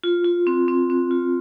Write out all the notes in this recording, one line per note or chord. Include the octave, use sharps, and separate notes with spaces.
F4
F4
C4
C4
C4
F4